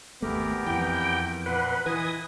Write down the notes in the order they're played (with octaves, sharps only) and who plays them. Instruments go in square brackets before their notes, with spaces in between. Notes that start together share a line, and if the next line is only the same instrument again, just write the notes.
[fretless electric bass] G#1 A3 [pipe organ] E2 G4 A#4 [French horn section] B3
[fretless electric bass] F2 E3 [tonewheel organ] G5
[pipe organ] A#2 F#5 C6 [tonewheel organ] B4
[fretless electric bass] E3 [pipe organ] B4 D#5 [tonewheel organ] G#5 D#6